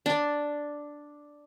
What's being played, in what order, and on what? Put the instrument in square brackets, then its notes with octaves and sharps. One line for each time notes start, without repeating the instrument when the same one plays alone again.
[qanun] D4